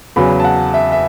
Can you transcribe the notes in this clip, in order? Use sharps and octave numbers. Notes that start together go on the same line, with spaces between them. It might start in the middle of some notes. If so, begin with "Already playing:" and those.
E2 C#3 F#3 B5
A5
F#5
E5
E5